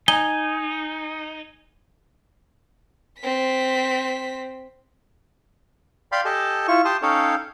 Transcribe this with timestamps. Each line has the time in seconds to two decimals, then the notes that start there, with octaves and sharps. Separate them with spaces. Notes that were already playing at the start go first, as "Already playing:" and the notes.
0.08 D#4 G#5 G7
3.19 C4 B6
6.12 D5 F5 G5 B5 C6
6.25 G4 A4 D#5 G#5 A5
6.68 E4 F4 C#6
6.85 G4 A5 C6 D#6
7.02 C#4 D#4 A4 C#5 F5 G5